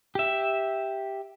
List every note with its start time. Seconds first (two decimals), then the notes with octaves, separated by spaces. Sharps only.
0.15 G4 E5